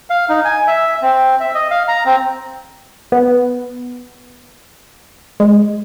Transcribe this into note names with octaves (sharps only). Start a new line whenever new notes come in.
F5
D#4
G#5
E5
C4
E5
D#5
F5
A#5
C4
B3
G#3